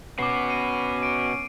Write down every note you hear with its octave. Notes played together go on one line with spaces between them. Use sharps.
B2 B3 C#4 D6 C7
D#7
D7